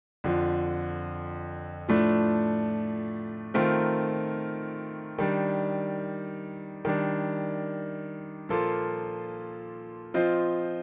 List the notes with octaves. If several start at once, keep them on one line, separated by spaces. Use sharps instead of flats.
F2 D3 F3
A2 F3 A3 D4
D#3 A3 C4 F4 A#4
D#3 G3 D4
D#3 G3 D4
A#2 F3 A#3 F4 A4
F3 C4 F4 C5 D#5